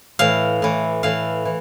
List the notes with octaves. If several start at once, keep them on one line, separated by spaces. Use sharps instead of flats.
A2 E3 F5
A2 E3
A2 E3 F5
E3